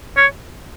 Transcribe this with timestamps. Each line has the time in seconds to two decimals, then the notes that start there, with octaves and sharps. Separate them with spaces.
0.17 C#5